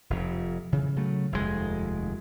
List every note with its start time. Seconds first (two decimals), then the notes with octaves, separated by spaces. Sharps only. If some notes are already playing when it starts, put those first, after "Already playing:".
0.10 F1 F2
0.73 C#3 E3
0.96 C#3 F#3 A3
1.32 F1 D#2 G#2 G#3